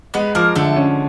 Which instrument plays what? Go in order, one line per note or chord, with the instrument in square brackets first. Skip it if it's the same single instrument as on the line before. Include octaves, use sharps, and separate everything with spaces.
[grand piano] G#3 [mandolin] B3 B4
[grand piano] F3 [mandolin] A#3 A#4
[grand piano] D3 [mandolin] A3 A4
[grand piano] C#4